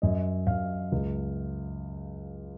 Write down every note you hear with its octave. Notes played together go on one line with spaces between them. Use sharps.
F#2 D#5
F#2 F5
C#2